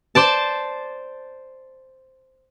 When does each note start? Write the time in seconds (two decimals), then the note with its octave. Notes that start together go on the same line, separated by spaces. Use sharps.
0.15 C5 D5 A5